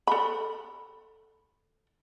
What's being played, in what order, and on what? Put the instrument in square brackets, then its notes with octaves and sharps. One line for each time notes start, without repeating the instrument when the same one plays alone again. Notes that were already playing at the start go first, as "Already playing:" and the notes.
[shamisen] A4 B5